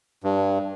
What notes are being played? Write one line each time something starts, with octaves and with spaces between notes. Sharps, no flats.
G2